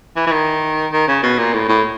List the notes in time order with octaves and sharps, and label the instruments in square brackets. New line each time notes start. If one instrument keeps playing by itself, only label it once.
[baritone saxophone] E3
E3
D#3
D#3
C#3
B2
A#2
A2
A2